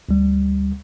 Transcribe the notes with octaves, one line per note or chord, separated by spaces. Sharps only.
D2 G3